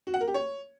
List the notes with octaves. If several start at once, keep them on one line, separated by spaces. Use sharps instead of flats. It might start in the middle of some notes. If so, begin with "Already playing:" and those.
F#4
F#5
A#4
G4
C#5